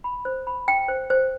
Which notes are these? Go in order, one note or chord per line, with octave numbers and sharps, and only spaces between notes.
B5
C5
B5
G5
C5
C5